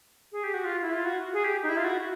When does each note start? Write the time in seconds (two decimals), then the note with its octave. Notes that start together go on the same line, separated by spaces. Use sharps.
0.32 G#4
0.44 G4
0.54 F#4
0.65 F4
0.82 E4
0.93 F4
1.05 F#4
1.33 G#4
1.44 G4
1.63 D#4
1.69 E4
1.77 F4
1.84 F#4